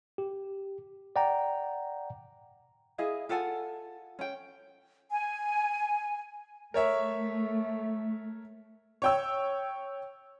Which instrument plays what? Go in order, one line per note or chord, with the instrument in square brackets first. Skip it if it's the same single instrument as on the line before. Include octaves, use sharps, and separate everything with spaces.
[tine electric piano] G4
D5 F#5 G5 A#5
[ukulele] E4 G#4 D#5 F5
F4 A4 F#5 G#5
C#4 G5
[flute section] G#5
[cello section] A3 [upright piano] A#4 C#5 E5
[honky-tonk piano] C#5 G5 E6